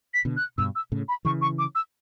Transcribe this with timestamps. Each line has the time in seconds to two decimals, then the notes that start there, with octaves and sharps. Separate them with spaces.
0.14 B6
0.25 B2 D3
0.37 F#6
0.58 G2 B2 E6
0.75 E6
0.92 A2 C#3
1.08 B5
1.25 C#3 E3 C#6
1.41 C#6
1.58 D6
1.75 E6